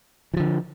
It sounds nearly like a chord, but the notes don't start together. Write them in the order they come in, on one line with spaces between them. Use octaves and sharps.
E3 F3 D3